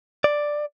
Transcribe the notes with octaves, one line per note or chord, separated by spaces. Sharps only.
D5